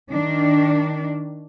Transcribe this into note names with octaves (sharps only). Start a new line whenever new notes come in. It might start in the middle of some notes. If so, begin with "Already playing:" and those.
D#3 D4